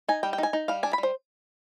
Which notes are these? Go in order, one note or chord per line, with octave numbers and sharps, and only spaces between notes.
D#4 G#5
G3 G5
G5
D#4 G#5
D#4
G3 F5
D4 G#5
G3 B5
C5